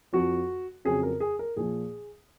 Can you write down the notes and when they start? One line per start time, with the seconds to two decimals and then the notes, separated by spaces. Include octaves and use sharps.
0.13 F2 F3 F#4
0.85 F2 C#3 F#3 G#4
1.03 A#4
1.20 G#4
1.39 A#4
1.57 A#2 F3 G#4